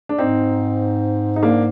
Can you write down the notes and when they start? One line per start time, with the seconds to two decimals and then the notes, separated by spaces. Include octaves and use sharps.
0.09 D4
0.19 G#2 C4 D#4
1.36 D#4
1.42 A#3 D4